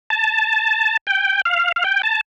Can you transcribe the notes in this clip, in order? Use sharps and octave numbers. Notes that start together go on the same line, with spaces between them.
A5
G5
F5
F5
G5
A5